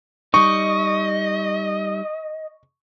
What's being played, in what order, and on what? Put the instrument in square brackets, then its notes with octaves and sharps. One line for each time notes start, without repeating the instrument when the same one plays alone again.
[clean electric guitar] G3 D#4 [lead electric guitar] D#5 [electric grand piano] C#6